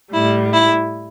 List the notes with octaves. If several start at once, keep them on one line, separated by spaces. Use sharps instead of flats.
A2 G3 E4
E4